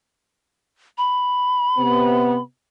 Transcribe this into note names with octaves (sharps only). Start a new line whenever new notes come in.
B5
C3 B3